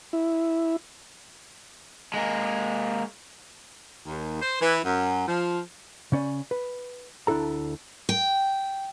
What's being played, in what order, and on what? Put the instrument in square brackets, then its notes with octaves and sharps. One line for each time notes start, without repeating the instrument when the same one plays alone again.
[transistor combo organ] E4
[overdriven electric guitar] G#3 A#3
[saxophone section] D#2
C5
E3
F#2
F3
[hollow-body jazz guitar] C#3 C#4 D5
B4
D2 D4 E4 A4 A#5
[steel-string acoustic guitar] G5